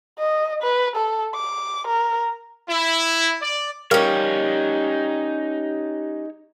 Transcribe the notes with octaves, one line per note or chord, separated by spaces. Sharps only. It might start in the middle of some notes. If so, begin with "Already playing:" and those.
D#5
B4
A4
D6
A#4
E4
D5
G3 C#4 D#4 A#4 C#5 F5 F6